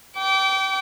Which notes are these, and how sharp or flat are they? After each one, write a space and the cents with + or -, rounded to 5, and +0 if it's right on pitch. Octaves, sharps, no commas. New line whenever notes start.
G5 -25 D6 -30